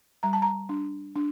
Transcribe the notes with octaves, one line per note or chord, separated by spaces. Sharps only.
G3 A#5
A5
A#5
D4
D4